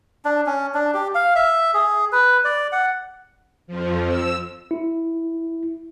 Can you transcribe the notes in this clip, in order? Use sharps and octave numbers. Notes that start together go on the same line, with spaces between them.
D4
C#4
D4
G4
F5
E5
G#4
B4
D5
F#5
F2 F3
E6
E4